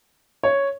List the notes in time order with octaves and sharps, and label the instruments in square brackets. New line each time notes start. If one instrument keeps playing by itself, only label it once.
[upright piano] C#5